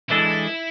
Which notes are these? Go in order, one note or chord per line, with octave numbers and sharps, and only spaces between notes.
E3 G#3 D4 E4 A4